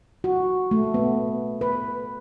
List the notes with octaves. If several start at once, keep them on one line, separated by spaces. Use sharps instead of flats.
F#4
A3
B3
B4